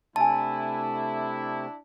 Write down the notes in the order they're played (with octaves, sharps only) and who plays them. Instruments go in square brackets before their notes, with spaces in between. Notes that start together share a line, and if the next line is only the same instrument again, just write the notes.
[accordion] C3 A3 [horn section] D4 E4 [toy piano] G#5 C6 [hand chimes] A5